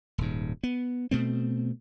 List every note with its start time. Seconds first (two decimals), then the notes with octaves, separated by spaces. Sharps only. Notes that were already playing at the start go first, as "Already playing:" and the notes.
0.18 D#1 G#2
0.63 B3
1.11 B2 A3 C4